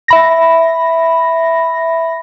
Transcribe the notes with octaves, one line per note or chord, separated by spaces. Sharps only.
E5 B5 A#6